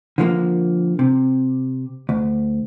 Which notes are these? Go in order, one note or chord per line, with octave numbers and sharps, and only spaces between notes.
D3 F3 A3 A#3
C3
D2